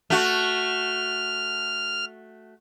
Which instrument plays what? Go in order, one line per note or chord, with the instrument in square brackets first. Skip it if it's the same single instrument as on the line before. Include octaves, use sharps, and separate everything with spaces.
[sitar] A3 F#4 [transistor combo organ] F6